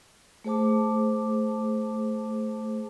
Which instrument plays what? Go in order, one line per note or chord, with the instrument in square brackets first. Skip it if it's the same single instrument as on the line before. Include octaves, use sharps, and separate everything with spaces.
[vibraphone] A3 G#4 C5 A5 D6